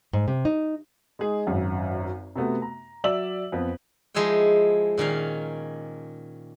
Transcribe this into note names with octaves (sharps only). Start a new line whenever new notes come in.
G#2
C3
D#4
G#3 D#4 G#4
G#1 F#2
C3 A3 B3 F#4
A#5
F#3 D5 E5 E6 F#7
F2 B3
F3 G#3 D#4 E4 C#5 G5
A#2 D#3 C#4 F5